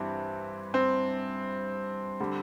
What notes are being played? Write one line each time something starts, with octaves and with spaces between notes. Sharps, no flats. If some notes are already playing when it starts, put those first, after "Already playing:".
Already playing: G2 E3 G3 C4
C4
D3 G3